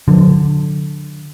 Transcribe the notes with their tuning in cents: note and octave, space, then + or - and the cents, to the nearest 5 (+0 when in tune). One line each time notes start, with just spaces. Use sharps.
D3 +0 F#3 -40